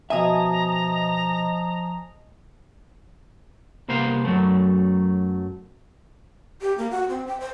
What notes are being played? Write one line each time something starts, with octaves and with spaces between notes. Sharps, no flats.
B2 F3 D#5 E5 G#5 A#5 D#6
C2 A#3 B3 C5 F5
F#2 F#3 A3
G4
A#3
F#4
C4
G5
C5